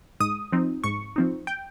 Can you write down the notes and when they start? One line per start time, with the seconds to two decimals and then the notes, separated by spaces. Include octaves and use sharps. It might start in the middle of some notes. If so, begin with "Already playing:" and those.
0.20 G#2 D#6
0.52 F3 C4 D#4
0.84 G#2 C#6
1.16 F3 C4 D#4
1.47 G5